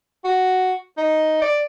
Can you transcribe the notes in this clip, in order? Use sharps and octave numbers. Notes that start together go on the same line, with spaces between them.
F#4
D#4
D5